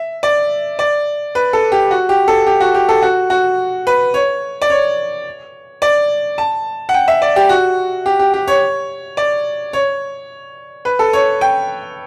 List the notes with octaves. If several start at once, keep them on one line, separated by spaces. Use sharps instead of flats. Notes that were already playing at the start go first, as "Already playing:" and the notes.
Already playing: E5
D5
D5
B4
A4
G4
F#4
G4
A4
G4
F#4
G4
A4
F#4
F#4
B4
C#5
D5
C#5
D5
A5
F#5
G5
E5
D5
G4
F#4
G4
G4
G4
C#5
D5
C#5
B4
A4
C#5
G5